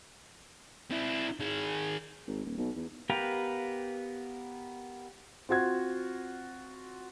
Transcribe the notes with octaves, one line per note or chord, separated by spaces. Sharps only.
C4 E4
D#3 G#4
G#1
D#1
B1
E2
B3 G4 A#4 B4 F5
C4 F4 F#4 G#6